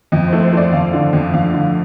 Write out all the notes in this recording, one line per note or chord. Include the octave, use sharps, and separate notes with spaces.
F2 D#5
C5
A3
C5
A3 D5
F2 F5
D3
F2
F2 F5
D3